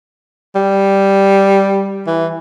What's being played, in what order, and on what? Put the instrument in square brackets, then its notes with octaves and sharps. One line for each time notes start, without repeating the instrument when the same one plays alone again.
[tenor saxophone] G3
E3